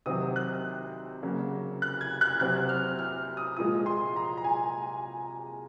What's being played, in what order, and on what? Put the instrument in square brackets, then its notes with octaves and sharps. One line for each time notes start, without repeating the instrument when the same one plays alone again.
[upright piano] C3 D#3 F#3 C4 D#6
F#6
C#3 F#3 A#3
F#6
G#6
F#6
C3 F#3 C4 F#6
F6
F6
D#6
A#2 F3 G#3 D#6
C6
A#5
A#5
G#5